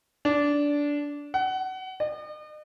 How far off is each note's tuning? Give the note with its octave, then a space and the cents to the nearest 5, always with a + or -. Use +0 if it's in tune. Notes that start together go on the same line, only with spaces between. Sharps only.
D4 -15
F#5 +25
D#5 -45